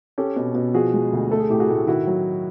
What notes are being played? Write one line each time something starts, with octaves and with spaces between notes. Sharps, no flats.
C#4 G4 A4
B2
B2
F3 F#4 G#4
G#3
D2
A3 A4
G#4
A2 G4
F#4 G#4
A2
D#3 E4 F#4
F#3